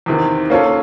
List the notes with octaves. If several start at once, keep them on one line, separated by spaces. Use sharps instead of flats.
E2 C3 D#3
A#3 C#4 F4 A4